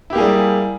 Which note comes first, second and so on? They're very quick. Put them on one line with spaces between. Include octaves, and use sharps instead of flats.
E4 G4 A#3 G#4 G3